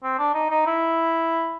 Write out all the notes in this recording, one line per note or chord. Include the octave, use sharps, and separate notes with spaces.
C4
D4
D#4
D#4
E4